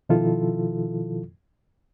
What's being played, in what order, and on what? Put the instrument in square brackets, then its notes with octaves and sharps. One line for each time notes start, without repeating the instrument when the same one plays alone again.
[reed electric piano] B2 D#3 F3 E4 F4 A4